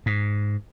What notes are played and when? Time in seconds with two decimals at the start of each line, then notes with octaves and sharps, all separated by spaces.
0.06 G#2